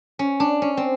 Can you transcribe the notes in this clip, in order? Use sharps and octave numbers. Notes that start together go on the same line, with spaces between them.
C#4
D4
C#4
C4